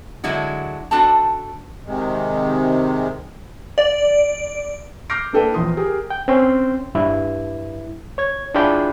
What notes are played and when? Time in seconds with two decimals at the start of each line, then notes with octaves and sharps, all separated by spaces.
0.24 D3 F#3 G#3 E4 F#4
0.91 D4 F#4 A4 G5 A5
1.86 C3 D#3 G#3
3.78 D5
5.10 D6 F6 G6 A#6 C7 D7
5.33 A#3 D4 E4 A4 B4 G5
5.54 A#1 E2 F4 C6 D#6
5.77 G4 G#4 A#4
6.10 G5
6.28 C4 C#4 G5 C6
6.95 G2 E4
8.18 C#5 G#6
8.55 D4 E4 F4 G#4 G5 B5